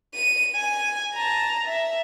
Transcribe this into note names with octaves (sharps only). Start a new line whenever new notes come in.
D#7
G#5
A5 A#5
E5